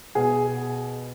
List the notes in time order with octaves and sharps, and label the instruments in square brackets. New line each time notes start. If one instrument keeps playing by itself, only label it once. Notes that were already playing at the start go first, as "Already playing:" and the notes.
[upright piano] B2 G#4